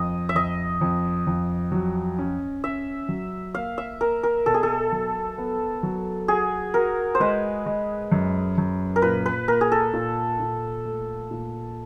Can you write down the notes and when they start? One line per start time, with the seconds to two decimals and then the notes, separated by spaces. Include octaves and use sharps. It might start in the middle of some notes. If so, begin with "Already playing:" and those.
Already playing: F2 D#5
0.29 E5
0.35 F2 D#5
0.81 F2
1.27 F2
1.72 F#3
2.18 C#4
2.64 C#4 E5
3.09 F#3
3.54 A#3 F5
3.78 E5
4.01 A#3 A#4
4.23 A#4
4.46 B2 A4
4.54 G#4
4.63 A4
4.92 F#3
5.38 B3
5.83 F#3
6.28 F#4 G#4
6.74 F#4 A#4
7.15 C5
7.20 G#3 B4
7.66 G#3
8.12 F#2
8.58 F#2
8.96 A#4
9.02 A#2 B4
9.26 B4
9.48 A#3 A#4
9.61 G#4
9.72 A4
9.93 A#2
10.40 A#2
10.85 A3
11.31 A#2